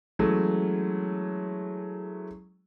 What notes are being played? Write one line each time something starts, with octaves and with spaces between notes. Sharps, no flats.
E3 F#3 G#3 A3 C#4